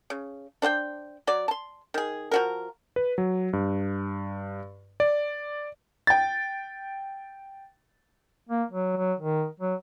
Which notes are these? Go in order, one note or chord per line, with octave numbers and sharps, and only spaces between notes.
C#3
D4 C5 F#5 G5
F#3 D5
A5 C6
D#3 G#4
F3 F#4 A#4
B4
F#3
G2
D5
G5 A6
A#3
F#3
F#3
D#3
F#3